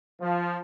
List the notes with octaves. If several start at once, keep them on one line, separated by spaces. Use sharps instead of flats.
F3